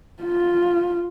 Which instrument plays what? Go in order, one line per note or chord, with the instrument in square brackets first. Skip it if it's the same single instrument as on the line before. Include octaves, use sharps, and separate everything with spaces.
[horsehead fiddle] F4